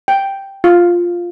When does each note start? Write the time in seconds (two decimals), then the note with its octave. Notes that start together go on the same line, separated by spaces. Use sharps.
0.08 G5
0.64 F4